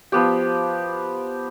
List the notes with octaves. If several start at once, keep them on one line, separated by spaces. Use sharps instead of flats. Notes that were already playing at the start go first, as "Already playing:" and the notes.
F3 B3 G4